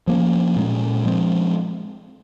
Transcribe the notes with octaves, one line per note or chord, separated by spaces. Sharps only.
F3 A#3 C#4
A#2 G#3 C#4
F3 G#3 C4